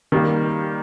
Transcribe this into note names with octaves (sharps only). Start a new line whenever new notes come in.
D#3 G3 A#3